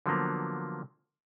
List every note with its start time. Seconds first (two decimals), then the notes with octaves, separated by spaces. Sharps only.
0.06 D3 F3 F#3 A#3 B3